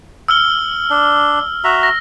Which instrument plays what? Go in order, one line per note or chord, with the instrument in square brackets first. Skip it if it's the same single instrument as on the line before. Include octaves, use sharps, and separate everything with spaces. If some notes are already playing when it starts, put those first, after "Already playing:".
[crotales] E6 F6 G7
[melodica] D4
F#4 E5 A#5
[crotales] A#6